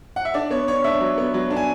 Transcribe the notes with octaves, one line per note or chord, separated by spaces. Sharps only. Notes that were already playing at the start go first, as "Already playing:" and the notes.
F#5
E5
D4 D5
B3 C#5
D4 C#5
D4 E5
F#3
B3
F#3
D4
G#5